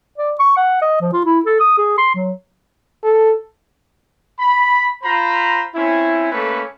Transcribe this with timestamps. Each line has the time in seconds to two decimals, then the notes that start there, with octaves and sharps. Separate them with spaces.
0.18 D5
0.39 C#6
0.57 F#5
0.82 D#5
1.01 F3
1.13 F4
1.25 E4
1.46 A4
1.60 D#6
1.78 G#4
1.98 C6
2.15 F#3
3.04 A4
4.39 B5
5.03 F4 C5 A#5 B5
5.75 C4 C#4 E4
6.32 A3 A#3 C#4 A4 B4